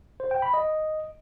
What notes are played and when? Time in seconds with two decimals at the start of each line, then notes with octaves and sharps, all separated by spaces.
0.20 C5
0.31 G5
0.42 B5
0.54 D#5